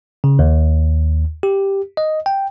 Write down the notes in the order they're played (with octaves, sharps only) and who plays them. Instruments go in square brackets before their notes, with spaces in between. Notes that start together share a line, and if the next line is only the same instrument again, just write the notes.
[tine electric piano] C#3
D#2
G4
D#5
G5